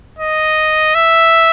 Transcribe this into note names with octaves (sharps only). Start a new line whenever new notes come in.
D#5
E5